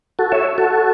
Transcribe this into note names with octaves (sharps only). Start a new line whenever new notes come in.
F#4 A4
C#5 E5
F#4 A4